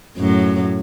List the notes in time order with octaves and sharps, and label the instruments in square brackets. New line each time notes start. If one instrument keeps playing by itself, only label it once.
[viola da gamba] F#2 A2 F#3